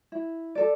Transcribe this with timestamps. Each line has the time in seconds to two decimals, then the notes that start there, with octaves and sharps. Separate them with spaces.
0.12 E4
0.55 A4 D5